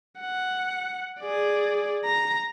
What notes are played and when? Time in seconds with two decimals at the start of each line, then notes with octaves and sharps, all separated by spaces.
0.20 F#5
1.20 G#4 D5
2.05 A#5